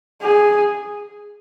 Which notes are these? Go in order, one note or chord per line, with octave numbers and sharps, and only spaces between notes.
G#4